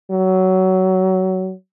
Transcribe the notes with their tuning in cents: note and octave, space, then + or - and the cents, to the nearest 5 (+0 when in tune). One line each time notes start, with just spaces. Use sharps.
F#3 +20